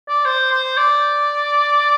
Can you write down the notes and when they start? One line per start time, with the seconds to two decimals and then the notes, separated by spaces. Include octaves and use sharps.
0.09 D5
0.25 C5
0.51 C5
0.77 D5